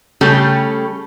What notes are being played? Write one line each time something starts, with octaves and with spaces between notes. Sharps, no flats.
C#3 G3 A3 G4 A4 C#5